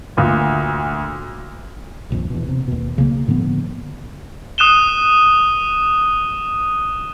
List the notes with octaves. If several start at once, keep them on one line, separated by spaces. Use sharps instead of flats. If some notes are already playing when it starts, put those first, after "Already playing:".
D2 A#2
D#1 A#1 F2
E2 B2
C3
D#2 B2
C2 C#3 F3 A#3
A2 D3 F3 B3
D#6 F#6 D#7 E7 G7